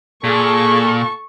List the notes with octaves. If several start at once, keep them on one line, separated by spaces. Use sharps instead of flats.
A#2 G#4 A4 C#6